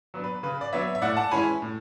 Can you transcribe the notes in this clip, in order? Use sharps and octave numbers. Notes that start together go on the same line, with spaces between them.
F#3 B3 D4
B4
C#3 B4
D5
F#3 B3 D4 C#5 E5
E5
A2 D5 F#5
F#5 A5
E3 G#3 C#4 E4 G#5 B5
A2